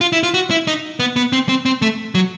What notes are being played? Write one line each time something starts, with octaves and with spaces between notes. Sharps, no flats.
F4
E4
F4
F#4
E4
D#4
B3
B3
C4
C4
C4
A3
F#3